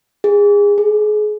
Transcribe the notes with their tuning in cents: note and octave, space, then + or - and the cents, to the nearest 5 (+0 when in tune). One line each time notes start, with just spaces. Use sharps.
G#4 -25
G#4 +30